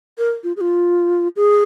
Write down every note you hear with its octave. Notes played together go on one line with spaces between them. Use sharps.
A#4
F4
G#4
F4
G#4